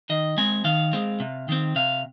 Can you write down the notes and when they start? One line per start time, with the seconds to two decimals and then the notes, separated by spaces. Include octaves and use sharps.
0.10 D#3 D#5
0.37 G#3 C4 G#5
0.64 D#3 F5
0.93 G#3 C4
1.20 C3
1.49 D#3 C4
1.76 C3 F5